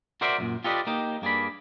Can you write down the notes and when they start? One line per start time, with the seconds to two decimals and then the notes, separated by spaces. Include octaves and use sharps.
0.21 F#4 A#4 C5 D5 E5
0.38 C2 F#2 A#2
0.64 F4 G4 A4 B4 D5 D#5
0.87 A#3 D#4 G4
1.22 G2 A#3 G#4 D5 B5